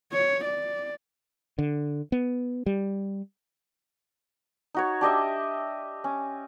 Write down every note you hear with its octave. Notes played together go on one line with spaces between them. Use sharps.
C#5
D5
D3
B3
G3
D#4 F#4 C#5
D4 G4 D#5 E5
C#4